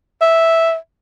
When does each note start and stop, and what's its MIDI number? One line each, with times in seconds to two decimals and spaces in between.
0.21 0.76 76